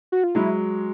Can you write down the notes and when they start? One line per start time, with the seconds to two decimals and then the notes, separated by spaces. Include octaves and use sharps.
0.12 F#4
0.24 F4
0.35 F#3 G#3 E4